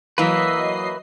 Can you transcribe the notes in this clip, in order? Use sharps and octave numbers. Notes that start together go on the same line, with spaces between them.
E3 F#3 A#3 B4 D#5 E5 C7